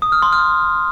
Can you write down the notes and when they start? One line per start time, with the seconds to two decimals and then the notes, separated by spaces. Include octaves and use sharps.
0.02 D#6
0.12 F6
0.22 C6
0.33 F6